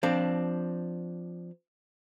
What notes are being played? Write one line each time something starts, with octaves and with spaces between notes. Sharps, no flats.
F3 C4 D4